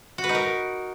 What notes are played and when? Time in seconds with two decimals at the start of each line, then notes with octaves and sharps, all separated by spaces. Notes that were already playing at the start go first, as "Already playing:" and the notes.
0.18 F#4
0.24 B4
0.29 D#4
0.35 A#4